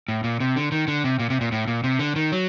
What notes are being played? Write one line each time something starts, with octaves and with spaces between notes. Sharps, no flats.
A2
A#2
C3
D3
D#3
D3
C3
A#2
C3
A#2
A2
A#2
C3
D3
D#3
F#3